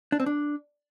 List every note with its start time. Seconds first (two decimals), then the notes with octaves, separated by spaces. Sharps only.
0.12 D4
0.20 C4
0.26 D4